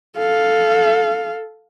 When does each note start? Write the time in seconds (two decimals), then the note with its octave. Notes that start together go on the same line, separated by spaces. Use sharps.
0.17 A4 F5